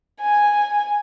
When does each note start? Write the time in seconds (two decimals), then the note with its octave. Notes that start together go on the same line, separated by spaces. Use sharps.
0.21 G#5